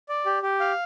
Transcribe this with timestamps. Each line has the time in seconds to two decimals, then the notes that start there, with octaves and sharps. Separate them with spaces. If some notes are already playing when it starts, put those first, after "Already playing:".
0.09 D5
0.26 G4
0.42 G4
0.60 F5